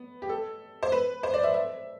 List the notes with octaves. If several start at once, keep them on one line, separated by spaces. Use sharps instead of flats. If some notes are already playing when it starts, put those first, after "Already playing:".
Already playing: B3
G4
A4
C5
B4
C5
D5
E5
E5